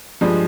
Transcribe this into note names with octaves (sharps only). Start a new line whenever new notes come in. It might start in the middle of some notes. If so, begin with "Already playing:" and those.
G2 F3 G#3